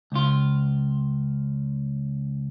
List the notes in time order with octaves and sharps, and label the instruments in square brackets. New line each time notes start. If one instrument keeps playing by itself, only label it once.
[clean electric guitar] C#2 F4